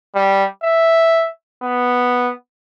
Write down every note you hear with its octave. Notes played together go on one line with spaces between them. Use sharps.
G3
E5
B3